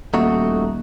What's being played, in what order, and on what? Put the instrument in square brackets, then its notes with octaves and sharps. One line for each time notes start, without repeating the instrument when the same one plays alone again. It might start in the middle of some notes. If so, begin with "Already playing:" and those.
[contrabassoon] D#1 [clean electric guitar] A3 D#4 F#4